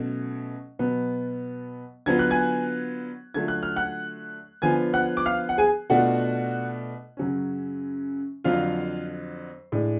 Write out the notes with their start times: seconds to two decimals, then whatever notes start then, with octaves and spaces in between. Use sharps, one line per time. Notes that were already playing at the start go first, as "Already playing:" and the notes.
Already playing: B2 F#3 A3 C#4
0.79 B2 F#3 B3
2.06 D3 F#3 B3 F4 G#6
2.19 F#6
2.31 G#5 G#6
3.34 D3 F#3 A3 F4 G#6
3.48 F#6
3.63 F6
3.76 F#5 F#6
4.62 D3 F3 B3 F4 G#5 G#6
4.94 F#5 F#6
5.17 D6
5.26 F5 F6
5.49 F#5
5.58 G#4 G#5
5.90 B2 A3 D4 F4 F#4 F#5
7.17 F#2 C#3 F#3 C#4
8.44 F2 D3 F#3 F4 F5
9.72 A2 G#3 D4